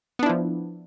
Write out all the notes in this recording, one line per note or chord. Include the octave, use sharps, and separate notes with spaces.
F3 B3 D4 E4